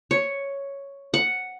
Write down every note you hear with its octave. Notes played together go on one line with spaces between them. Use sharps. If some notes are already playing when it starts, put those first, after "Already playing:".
C#5
F#5